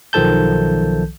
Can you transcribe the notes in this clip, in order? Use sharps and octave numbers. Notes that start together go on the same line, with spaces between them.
B1 D#3 F3 A4 A5 G6